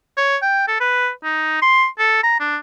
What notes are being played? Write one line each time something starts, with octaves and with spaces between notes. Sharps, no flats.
C#5
G5
A4
B4
D#4
C6
A4
A#5
D4